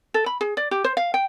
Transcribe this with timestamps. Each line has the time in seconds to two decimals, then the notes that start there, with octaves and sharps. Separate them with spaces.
0.14 A4
0.26 B5
0.41 G#4
0.57 D5
0.71 G4
0.84 C5
0.97 F5
1.14 G5